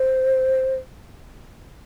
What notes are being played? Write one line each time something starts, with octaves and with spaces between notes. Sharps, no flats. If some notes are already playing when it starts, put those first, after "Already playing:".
Already playing: C5